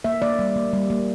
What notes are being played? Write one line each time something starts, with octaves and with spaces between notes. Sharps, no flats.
A#3 E5
A#3 D5
G3
A#3
G3
A#3